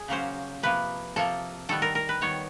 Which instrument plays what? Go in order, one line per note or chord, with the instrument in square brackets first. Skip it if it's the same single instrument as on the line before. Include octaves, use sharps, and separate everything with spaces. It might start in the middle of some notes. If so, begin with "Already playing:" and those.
Already playing: [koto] G#4
C#3 F#3 A#3 C#4 C5
C3 F3 A#3 B4
C3 F3 A#3 A4
D#3 G3 B3 A4
A#4
A#4
B4
D#3 G3 B3 C#5